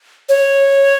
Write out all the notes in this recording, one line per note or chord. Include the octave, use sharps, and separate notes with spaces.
C#5